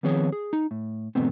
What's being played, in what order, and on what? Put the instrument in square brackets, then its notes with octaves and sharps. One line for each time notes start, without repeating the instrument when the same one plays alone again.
[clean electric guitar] D#3 F3 B3 C4 G#4 C#5
G#4
D#4
A2
E2 G#2 B2 A3 B3 C4